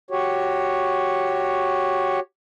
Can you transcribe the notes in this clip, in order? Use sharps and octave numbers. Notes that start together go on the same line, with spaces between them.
F#4 G4 C#5